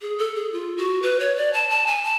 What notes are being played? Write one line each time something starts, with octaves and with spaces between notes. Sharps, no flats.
G#4
A4
G#4
F4
F#4
B4
C#5
D5
A5
A5
G#5
A5